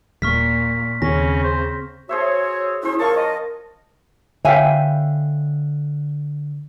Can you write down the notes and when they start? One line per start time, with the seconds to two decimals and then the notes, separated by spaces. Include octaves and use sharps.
0.22 D#1 A#2 C#6 F6 B6
1.02 D#2 C#3 C4 C#4 A#6
1.43 C5
2.09 F#4 G#4 C5 C#5 E5
2.83 C#4 E4 C5
2.99 F3 A#4 C#5 A5 C#6
3.16 D#5
4.45 D3 C#5 E5 F5 G5 G#5